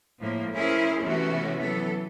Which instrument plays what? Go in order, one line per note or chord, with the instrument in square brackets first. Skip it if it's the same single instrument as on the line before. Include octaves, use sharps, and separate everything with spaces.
[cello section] A2 F3 G#3 A#3
C#4 E4 G#4 A#4 C5
C3 E3 A3 B3 C#4 F#4
E3 F#3 B3 A4